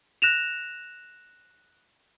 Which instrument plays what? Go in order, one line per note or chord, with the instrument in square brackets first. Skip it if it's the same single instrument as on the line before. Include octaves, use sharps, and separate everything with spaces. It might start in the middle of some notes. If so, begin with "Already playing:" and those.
[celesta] F#6 A#6 E7 F7